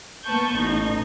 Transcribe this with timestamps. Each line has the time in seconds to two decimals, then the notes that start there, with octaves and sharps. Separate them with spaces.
0.25 A#3 B3 B4 A5 C#6 G6
0.55 A1 D#4